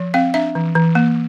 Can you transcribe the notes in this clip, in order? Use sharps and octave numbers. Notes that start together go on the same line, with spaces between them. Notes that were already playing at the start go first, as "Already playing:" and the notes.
Already playing: F3
C4 F5
D4 E5
E3
E3
A#3